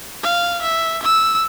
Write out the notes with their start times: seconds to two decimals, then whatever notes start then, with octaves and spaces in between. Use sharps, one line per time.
0.23 F5
0.62 E5
1.03 E6